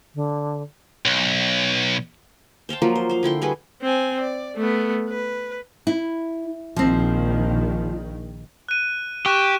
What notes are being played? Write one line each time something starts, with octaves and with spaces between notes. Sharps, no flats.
D3
B1
C5 F5 G5 A5
F3 F#3 A#3 F4
C5
C5 F5
D3 E4 G5 C6
G3 F#4 G#4 B4
C4 G#5
D5
A3 B3
B4
E4
A#1 D#3 F3 C4
F#6 D#7
G4 C#6 F#6 E7